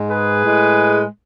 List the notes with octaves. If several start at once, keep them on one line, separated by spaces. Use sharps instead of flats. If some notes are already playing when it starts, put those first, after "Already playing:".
Already playing: G#2 G#3
G#4 B4
A2 G#3